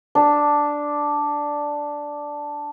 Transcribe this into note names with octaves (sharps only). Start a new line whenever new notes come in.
D4 A5